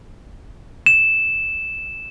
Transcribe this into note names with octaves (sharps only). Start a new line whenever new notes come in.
E7